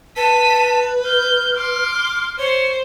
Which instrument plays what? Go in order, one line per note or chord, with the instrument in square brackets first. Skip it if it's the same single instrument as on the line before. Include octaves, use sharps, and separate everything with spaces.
[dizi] B4 [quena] A5 [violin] B6 D#7
[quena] F6 [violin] G6
[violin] C6 D6
[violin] C5 [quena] C#5